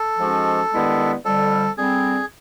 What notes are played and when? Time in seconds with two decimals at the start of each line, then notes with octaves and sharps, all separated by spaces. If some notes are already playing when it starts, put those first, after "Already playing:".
Already playing: A4
0.19 G#2 F3 G#3 C#4 F#4
0.72 G2 D#3 G#3 B3 E4
1.25 F2 D3 G3 A4
1.78 D3 G3 C4 G#4